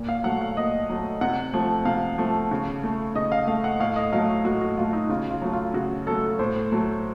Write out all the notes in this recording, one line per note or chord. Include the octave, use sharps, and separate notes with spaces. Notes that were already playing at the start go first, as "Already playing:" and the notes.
Already playing: A#2
F5
F#3 A3 F#5
F5
A#2 D#5
F#3 A3
C3 F#5
F3 A3
C3 F5
F3 A3
C#3
A3
C#3 D#5
F5
A3 F5
F#5
A2 F5
D#5
F#3 A3 F5
A2 F#4
F#4
F#3 A3 F4
D#4
C#3 F4
F4
F#3 A3
F4
C#3 F#4
F#3 A3 A4
A2 C5
F#3 A3